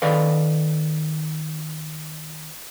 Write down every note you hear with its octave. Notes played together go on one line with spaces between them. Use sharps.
D#3 A4 B4 D5 F5